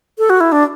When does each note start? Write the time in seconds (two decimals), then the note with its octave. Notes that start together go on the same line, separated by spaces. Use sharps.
0.18 A4
0.30 F#4
0.40 E4
0.52 D4